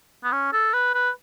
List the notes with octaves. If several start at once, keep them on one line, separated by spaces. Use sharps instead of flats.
B3
C#4
A4
B4
B4